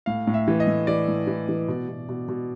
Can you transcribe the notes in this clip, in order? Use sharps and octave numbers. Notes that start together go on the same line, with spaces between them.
A2 F5
A2
E5
E3
D#5
A2
E3 D5
A2
E3
E3
B2
B2
B2
B2